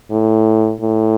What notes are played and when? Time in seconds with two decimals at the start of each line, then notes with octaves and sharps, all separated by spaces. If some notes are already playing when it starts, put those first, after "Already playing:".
0.12 A2
0.81 A2